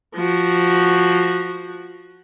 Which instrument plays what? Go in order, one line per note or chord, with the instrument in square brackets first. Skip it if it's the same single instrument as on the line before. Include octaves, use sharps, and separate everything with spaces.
[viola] F3 F#4